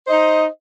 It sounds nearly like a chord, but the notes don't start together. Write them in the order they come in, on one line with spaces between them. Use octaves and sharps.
C5 D#5 D#4